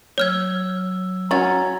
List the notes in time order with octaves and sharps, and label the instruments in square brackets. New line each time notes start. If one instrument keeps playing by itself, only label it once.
[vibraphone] F#3 E6 [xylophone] C#5 F6 G#6
[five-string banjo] C#4 F#4 [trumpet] A#5 [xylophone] C#6 A6